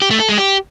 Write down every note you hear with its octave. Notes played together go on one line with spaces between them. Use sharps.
G4
A3
A4
G#3
G4